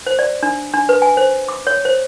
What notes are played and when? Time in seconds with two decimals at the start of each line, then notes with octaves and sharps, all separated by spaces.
0.07 C5
0.19 D5
0.43 D4
0.74 D4
0.89 B4
1.02 G#5
1.17 C5
1.49 D6
1.67 C#5
1.85 C5